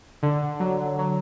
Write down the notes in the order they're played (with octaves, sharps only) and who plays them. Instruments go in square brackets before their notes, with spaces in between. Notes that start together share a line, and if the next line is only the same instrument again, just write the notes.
[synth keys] D3
F#3
F#3